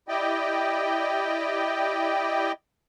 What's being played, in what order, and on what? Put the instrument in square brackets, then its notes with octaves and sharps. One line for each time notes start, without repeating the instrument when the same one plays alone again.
[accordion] E4 G4 D5 D#5 G5